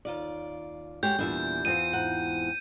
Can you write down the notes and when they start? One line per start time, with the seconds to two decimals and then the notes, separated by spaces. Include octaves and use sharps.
0.05 D#2 F4 D5
1.03 G#3 F#4 G4 C#5 G6
1.19 E2 A#2 G3 D4 E5
1.65 E2 C4 F4 D#7
1.93 G#2 F#5